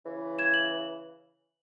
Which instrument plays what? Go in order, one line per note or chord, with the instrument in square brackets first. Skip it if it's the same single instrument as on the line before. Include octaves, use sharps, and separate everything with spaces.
[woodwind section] C#3 E3
[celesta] G#6 E7
F#7